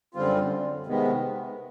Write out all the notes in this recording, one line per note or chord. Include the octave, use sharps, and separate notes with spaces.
F#2 D3 G3 C4 F4
C3 D#3 G#3 B3